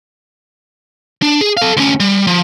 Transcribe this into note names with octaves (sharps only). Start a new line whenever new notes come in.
D4
G#4
A4 F5
D2 C#4
G3
F3